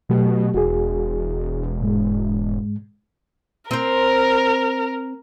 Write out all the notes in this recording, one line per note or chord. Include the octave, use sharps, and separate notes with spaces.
B2 F#3 A3 G4
E1 F#4 G#4
G#2 G#3
C4 A#4 C5